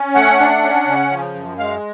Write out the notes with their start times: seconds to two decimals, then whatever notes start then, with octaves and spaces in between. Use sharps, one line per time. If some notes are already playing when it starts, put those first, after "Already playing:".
Already playing: C#4
0.15 A3 F#5
0.39 D4
0.63 C#4
0.87 C#3
1.11 F3
1.34 F#2
1.58 G#3 F5